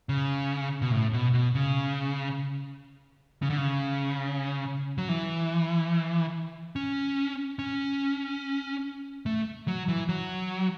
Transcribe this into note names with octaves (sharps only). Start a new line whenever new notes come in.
C#3
B2
A2
B2
B2
C#3
C#3
D3
C#3
F#3
E3
C#4
C#4
A3
F#3
E3
F#3